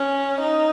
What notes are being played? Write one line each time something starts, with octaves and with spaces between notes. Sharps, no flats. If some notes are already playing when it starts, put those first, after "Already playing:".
Already playing: C#4
D#4